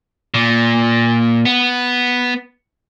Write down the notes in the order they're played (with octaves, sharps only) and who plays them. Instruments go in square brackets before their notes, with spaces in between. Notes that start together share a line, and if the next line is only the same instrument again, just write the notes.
[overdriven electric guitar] A#2
B3